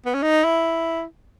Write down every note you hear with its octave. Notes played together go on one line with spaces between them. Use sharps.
B3
C#4
D#4
E4